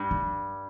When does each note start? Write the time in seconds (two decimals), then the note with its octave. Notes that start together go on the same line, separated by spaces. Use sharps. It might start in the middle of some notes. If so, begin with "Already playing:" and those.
Already playing: G2
0.11 G3